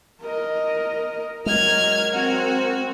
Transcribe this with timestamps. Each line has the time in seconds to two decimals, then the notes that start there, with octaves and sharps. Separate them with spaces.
0.21 A#4 D#5
1.46 F#3 G#3 A#4 F6 G#6
2.13 C4 F#4